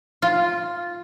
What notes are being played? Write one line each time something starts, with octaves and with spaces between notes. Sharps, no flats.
F4